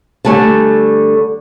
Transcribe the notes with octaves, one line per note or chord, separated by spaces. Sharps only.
D3 G3 A3 G#5 A5